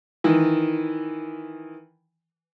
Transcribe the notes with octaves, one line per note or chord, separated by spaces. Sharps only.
D#3 E3